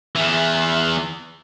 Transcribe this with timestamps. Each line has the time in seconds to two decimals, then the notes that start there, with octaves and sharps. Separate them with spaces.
0.15 E2 E3